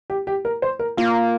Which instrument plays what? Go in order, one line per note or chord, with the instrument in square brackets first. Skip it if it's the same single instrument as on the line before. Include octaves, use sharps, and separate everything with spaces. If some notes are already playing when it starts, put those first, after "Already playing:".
[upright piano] G4
G4
A#4
C5
A#4
[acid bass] A#3 [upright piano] F4